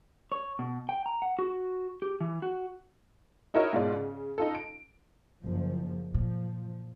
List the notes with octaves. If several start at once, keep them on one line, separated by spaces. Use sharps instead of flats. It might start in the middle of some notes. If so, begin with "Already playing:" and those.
C#5
B2
G5
A#5
F#5
F#4
G4
E3
F#4
D#4 E4 F#4 A#4 C#5 D#5
G#2 B2 F4 D5
C#3
D#4 F4 A4
D7
F#1 F3
A#2 F3